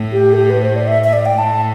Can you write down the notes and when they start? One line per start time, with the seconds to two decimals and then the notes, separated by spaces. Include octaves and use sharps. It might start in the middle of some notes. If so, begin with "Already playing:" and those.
Already playing: A2
0.12 G4
0.33 A4
0.37 G4
0.50 B4
0.62 C5
0.76 D5
0.87 E5
1.04 E5
1.13 D5
1.26 G5
1.38 A2 A5